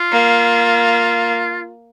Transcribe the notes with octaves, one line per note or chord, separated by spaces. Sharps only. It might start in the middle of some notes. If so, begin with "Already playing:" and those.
Already playing: F4
A#3